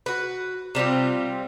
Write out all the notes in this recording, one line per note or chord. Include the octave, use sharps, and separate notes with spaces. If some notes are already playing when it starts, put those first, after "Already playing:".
F#4 B4
C3 G3 C4 F4